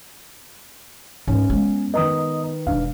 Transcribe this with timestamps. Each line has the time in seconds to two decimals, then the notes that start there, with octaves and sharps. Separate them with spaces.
1.28 G#2 C#4
1.49 G#3 B3
1.94 D#3 B4 D#5 A#5 D#6
2.67 E1 D4 F5